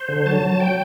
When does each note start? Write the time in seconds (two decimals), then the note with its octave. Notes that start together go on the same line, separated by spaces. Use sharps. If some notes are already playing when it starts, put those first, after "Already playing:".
Already playing: C5
0.08 D3
0.26 F#3 A5
0.42 F#3
0.49 A5
0.60 G5